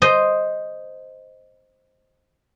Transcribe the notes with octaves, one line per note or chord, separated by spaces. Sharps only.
C5 D#5